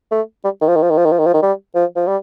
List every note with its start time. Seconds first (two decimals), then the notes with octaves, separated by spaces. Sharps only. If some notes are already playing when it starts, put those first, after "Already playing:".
0.12 A3
0.44 G3
0.61 D#3
0.68 F3
0.76 D#3
0.83 F3
0.90 D#3
0.98 F3
1.05 D#3
1.12 F3
1.19 D#3
1.27 F3
1.34 D#3
1.42 G3
1.75 F3
1.96 F3
2.07 G3